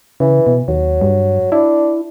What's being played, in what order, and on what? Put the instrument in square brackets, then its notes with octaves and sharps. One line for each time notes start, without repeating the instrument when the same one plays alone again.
[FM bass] C#3 [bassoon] E3
[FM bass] B2
[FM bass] D#2 [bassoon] F#3
[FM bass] G2
[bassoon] D4 [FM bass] E4